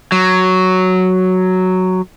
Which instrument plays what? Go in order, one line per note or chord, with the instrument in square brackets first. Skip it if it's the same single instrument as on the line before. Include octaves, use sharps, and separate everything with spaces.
[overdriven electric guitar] F#3